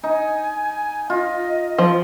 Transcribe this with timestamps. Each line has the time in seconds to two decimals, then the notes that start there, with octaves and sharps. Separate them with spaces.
0.04 D#4 G#5
1.10 F4 D#5
1.78 F3